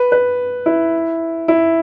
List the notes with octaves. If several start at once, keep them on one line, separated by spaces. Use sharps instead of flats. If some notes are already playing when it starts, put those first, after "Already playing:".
Already playing: B4
B4
E4
E4